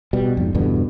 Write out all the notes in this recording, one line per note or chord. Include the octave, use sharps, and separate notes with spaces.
B2 G3
F2 G#2
E2 G2 B2 D3